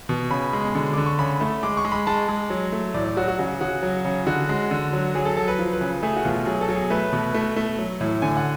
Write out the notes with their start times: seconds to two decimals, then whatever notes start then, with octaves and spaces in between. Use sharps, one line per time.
0.09 B2
0.30 C#3 B5
0.53 G#3
0.75 D3
0.93 D3 D6
1.06 C#6
1.19 C#3 B5
1.41 A3
1.63 G#3 D6
1.77 C#6
1.85 G#3
1.92 B5
2.07 G#3 A5
2.29 G#3
2.50 F#3
2.72 A3
2.94 A2 D5
3.06 D5
3.17 F#3 F#4
3.28 F#4
3.39 C#3 F#4
3.61 C#3 F#4
3.83 F#3
4.05 C#3
4.27 D3 F#4
4.49 G#3
4.71 D3
4.93 F#3
5.15 F#3 G#4
5.25 A4
5.37 F#3 A4
5.48 B4
5.59 F3
5.73 B4
5.81 C#3
6.03 A3 G#4
6.17 F#4
6.25 B2 F4
6.46 F#3 G#4
6.61 A4
6.69 F#3
6.76 G#4
6.90 A3 B4
7.13 B2
7.34 A3
7.56 A3
7.78 F#3
8.01 A2
8.22 D3 G#5
8.37 F#5